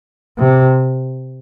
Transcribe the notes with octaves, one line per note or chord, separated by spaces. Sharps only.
C3